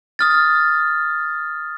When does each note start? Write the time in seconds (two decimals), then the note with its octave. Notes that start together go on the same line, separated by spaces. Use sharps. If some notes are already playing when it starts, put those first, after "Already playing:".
0.19 D#6 F6 A6